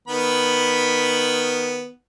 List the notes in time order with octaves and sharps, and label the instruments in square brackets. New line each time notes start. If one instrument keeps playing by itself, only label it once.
[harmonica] D#3 B3 B5